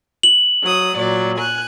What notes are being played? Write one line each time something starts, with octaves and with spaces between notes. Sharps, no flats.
F#7
F#3 D#6
A#2 F#3 D5
G#5 F#6